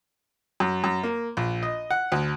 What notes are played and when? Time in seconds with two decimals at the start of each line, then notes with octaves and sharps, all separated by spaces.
0.60 F#2
0.84 F#2
1.03 A#3
1.37 A#1
1.63 D#5
1.91 F#5
2.12 D2